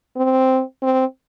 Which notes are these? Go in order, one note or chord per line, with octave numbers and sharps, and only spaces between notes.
C4
C4